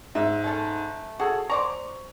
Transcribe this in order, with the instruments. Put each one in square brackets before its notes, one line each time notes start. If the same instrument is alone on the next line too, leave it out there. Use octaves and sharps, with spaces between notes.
[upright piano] G#2 [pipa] E5
[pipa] A3 C#4 A4
[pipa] C#4 F#4 [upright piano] G#4 A4
[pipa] C5 D5 A#5 [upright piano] C#6 F7